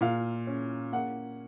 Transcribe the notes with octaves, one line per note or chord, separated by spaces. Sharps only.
A#2 F5
C#4
A#3 F#5